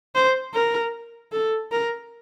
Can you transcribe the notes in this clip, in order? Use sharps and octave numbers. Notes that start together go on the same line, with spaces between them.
C5
A#4
A4
A#4